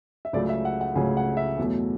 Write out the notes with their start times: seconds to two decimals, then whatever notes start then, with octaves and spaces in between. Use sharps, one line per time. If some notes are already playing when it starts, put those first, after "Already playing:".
0.25 E5
0.33 C#2 C#3 F#3 A3 D5
0.49 E5
0.65 F#5
0.81 F#5
0.95 C#2 C#3 F#3 A3 G#5
1.17 F#5
1.37 E5
1.58 E2 B2 F#3 A3